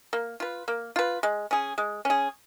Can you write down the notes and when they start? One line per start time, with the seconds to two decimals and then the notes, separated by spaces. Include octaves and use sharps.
0.13 A#3
0.40 F4 B4
0.68 A#3
0.96 F4 B4
1.23 G#3
1.51 C#4 G#4
1.78 G#3
2.05 C#4 G#4